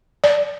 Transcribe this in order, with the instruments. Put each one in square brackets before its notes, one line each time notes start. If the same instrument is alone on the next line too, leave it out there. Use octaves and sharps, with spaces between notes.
[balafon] D5